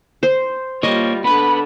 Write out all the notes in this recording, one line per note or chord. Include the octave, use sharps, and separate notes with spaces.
C5
G3 A#3 F4 C#5 D#5
D3 B3 D4 B4 B5